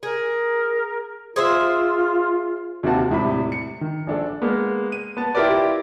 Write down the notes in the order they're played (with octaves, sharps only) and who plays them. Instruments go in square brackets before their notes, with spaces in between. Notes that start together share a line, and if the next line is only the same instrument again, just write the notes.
[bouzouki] G#4 [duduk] A#4
[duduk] F4 [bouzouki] G#4 C5 E5
[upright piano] D#2 C3 D#3 F#4 A5
E1 A2 C3 B5
C#7
D#3
A#1 D4 A4
[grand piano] G#3 A#3 B3
D#7
B3 A5
E4 F4 G4 A#4 B4 D5